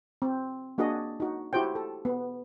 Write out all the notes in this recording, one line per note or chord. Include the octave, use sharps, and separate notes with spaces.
C4
A#3 D4 F#4 G#4 D#5
D#4 F#4
E4 F#4 G4 C5 G5
A4
B3